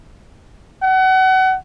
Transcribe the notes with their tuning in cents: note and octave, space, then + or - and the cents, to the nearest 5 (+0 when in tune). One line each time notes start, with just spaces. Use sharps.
F#5 +30